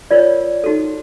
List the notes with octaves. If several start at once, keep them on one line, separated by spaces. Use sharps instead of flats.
F4 A#4 C#5 D5
D#4 F#4 A4